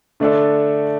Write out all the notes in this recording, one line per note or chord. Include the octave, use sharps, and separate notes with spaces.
D3 A3 D4 A4